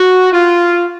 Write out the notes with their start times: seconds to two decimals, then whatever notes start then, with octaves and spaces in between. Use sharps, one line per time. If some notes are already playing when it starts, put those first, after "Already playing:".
Already playing: F#4
0.33 F4